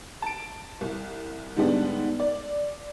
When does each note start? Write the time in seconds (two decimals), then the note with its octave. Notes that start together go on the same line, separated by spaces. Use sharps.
0.22 A5 D7
0.81 C2
1.56 G#2 D3 G3 G#3 B3 D4
2.20 D5